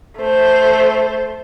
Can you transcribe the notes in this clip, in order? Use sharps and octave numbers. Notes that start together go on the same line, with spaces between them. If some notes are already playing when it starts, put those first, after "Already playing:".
A3 C5